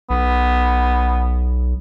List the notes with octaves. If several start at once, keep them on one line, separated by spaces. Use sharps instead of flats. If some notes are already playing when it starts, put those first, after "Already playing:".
B1 B3